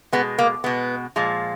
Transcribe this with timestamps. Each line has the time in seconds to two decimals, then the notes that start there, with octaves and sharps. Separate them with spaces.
0.12 B2 G#3 B3
0.38 A#3
0.64 B2 G#3 B3
1.16 A#2 F3 G#3